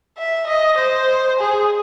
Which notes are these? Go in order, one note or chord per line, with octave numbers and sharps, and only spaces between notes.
E5
D#5
C5
G#4